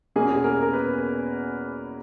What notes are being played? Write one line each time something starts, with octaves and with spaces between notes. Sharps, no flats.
E2 B2 A#3 C#4 G#4
G#4
A#4
A#4
B4